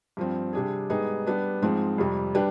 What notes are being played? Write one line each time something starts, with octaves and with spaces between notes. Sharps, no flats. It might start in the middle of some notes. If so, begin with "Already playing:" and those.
G2 F3 C4
C3 G3 D4 G#4
G#2 G3 B3 D#4 G#4
G3 B3 D4
G#2 F3 G#3 C4
F2 C3 G3
G3 D4 G4 B4